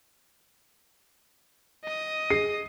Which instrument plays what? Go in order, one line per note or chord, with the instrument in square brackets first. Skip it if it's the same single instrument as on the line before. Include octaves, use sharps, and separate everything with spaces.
[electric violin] D#5 D#6
[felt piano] G#4 C7